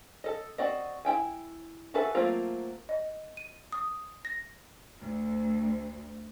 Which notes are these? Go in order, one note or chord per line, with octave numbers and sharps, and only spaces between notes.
A4 D#5
C4 F#4 D5 D#5
E4 G5 G#5
F#4 G#4 A4 B4 E5
F#3 A3 A#3 C4 F4
D#5
D#7
D#6
A#6
D2